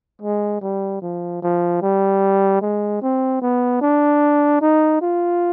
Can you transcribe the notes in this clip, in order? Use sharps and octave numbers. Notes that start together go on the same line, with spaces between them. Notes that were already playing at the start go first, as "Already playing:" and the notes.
G#3
G3
F3
F3
G3
G#3
C4
B3
D4
D#4
F4